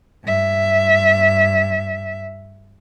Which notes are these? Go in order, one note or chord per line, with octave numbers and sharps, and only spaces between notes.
G2 E5